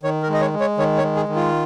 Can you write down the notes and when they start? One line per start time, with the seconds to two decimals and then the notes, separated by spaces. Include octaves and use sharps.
0.03 D#3 C#5
0.23 A#4
0.29 G#3
0.34 D#5
0.41 C#5
0.53 G#3
0.60 C#5
0.78 D#3 C#5
0.98 C#5
1.03 G#3
1.16 G#4
1.28 D#3
1.36 F4